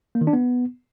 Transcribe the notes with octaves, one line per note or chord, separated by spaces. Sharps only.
A#3
D#3
D4
B3